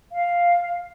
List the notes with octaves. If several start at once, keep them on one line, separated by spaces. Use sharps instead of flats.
F5